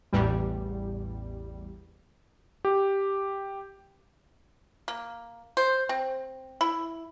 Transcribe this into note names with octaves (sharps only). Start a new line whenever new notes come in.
A1 E2 G3
G4
A#3
C5
C4
E4